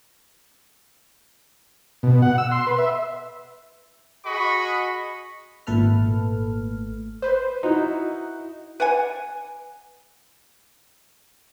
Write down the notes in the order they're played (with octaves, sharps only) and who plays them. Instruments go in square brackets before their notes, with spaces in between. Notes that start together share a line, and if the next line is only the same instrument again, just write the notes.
[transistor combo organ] B2
F#5
E6
C6
B4
E5
[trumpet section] F#4 G#4 D#5 B5 C#6
[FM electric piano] G#1 A#2 A3 A4 B4 F6
[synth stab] B4 C5
[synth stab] D#4 [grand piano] E4 F#4
[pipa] B4 D5 F#5 G#5